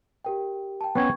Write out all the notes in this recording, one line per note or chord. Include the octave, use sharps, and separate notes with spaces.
G4 A#4 G5
G5 A5
B3 C#4 G5 C#6 G#6